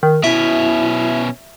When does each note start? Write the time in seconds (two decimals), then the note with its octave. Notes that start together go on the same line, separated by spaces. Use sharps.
0.03 D#3 A#4
0.24 B2 C#4 E4 E5